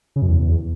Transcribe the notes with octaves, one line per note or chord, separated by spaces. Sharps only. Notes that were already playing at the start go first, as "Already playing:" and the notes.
C#3
F#2
E2